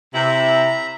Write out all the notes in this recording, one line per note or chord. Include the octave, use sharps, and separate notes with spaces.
C3 E4 E5 A#5